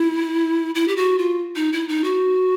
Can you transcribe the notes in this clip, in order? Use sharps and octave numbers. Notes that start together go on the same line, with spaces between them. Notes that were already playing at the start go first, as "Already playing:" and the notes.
Already playing: E4
E4
G4
F#4
F4
D#4
E4
D#4
F#4